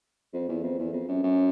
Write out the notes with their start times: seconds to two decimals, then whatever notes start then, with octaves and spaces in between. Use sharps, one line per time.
0.34 F2
0.49 E2
0.63 F2
0.79 E2
0.93 F2
1.08 F#2
1.23 F#2